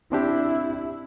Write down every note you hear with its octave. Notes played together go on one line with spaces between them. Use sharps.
C4 D4 E4 G4